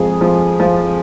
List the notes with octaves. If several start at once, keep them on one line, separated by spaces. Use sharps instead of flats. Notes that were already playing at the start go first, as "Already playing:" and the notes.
Already playing: F2 F3 G#3 G#4
F3
F3